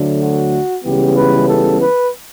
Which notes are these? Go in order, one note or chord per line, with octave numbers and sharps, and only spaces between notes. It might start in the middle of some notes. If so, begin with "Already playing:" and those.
Already playing: D2 D3 F#3 A3
F#4
C#2 C#3 E3 G3 B3 G4
B4
A4
B4